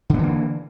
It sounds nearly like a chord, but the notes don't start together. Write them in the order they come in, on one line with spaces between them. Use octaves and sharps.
D3 B3 E3 A#3